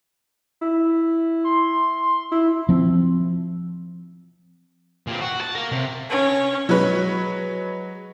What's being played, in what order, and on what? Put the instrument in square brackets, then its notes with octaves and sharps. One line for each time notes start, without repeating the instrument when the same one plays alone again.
[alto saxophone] E4
[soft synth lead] C6
[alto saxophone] E4
[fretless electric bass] F3 C4
[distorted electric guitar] A#2 C4
F#4
A5
A#4 F5
C3
[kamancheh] C#4
[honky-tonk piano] F#3 G#3 B4 C#5